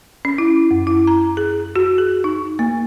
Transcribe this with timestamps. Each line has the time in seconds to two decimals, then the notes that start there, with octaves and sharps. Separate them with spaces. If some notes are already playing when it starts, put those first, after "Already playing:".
0.25 C#4
0.38 E4
0.71 F#2
0.87 E4
1.07 A#5
1.37 G#4
1.76 F#4
1.98 G#4
2.24 D#4
2.59 A#3